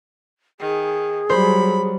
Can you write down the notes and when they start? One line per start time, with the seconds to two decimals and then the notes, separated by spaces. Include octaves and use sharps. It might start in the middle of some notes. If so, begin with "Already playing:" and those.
0.60 D#3 G#4
1.30 F#3 G3 C5 B5